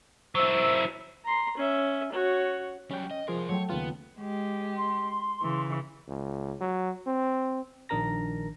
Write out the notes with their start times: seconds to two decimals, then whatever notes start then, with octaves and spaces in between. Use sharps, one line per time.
0.35 F#3 E4 C5 E6
1.24 A#5 C6
1.57 C#4 E5
2.12 F#4 C#5
2.91 F#3 G3 C#4 G5
3.11 D#5
3.28 C2 F3 G#4 A#4 C6
3.49 F#3 A3 C#5 G5
3.70 D#2 C#3 B3 F4
4.18 G#3 G4
4.77 C6
5.43 C#3 E3
6.08 C#2
6.61 F#3
7.07 C4
7.89 A#1 D#3 D4 A#4 A#5 A#6